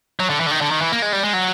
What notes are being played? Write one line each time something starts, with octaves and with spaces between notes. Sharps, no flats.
F#3
D3
E3
D3
D#3
D3
D#3
E3
A#3
G#3
G3
G#3
F#3